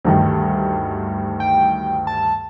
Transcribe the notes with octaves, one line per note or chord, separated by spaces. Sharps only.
D2 G2 D#3
G5
A5